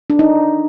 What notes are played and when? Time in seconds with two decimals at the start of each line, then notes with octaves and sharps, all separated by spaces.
0.10 D4
0.19 D#4